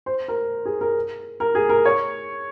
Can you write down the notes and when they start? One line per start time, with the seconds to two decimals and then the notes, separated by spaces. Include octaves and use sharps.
0.06 C5
0.28 A#4
0.65 G#4
0.81 A#4
1.40 A#4
1.55 G#4
1.69 A#4
1.85 C#5